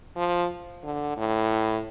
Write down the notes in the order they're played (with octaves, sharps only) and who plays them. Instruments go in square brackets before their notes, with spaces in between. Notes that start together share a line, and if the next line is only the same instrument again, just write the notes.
[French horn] F3
D3
A2